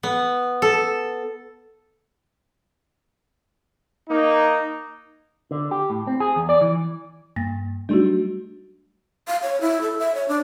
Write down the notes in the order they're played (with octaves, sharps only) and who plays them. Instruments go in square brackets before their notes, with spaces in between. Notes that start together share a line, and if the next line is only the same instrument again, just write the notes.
[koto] B3
A4
[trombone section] A#3 D#4
[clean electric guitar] D3
G4
A2
C4
G#4
E2
D5
E3
[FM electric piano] G2 [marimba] A#3 A6 A#6
[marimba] F#3 D#4 F#4 [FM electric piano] G3 A3 D4
[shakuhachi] F5
C#5
E4
A4
E5
C#5
D4